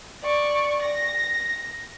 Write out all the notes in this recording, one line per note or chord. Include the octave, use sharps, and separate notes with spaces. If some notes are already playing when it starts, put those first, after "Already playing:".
D5 C#6
A#6